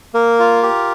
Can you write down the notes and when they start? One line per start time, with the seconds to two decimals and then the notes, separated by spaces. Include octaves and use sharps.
0.14 A#3 A#4
0.39 F4
0.63 G4